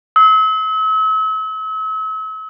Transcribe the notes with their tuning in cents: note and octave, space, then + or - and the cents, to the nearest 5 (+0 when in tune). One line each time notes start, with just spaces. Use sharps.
E6 -40